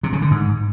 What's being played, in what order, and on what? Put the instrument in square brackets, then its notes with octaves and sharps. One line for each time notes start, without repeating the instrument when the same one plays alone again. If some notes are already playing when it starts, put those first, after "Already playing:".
[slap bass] C3
C#3
D3
G#2